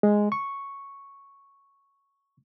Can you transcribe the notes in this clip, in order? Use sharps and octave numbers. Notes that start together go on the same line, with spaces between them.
G#3
C#6